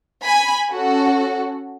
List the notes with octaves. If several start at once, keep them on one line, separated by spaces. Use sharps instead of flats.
G#5 B5
C#4 F#4 A4